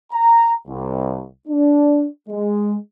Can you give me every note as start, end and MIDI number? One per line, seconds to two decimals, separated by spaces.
0.12 0.54 82
0.67 1.24 36
1.48 2.05 62
2.28 2.76 56